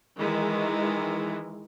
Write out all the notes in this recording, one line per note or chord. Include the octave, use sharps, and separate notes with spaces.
D#3 E3 G#3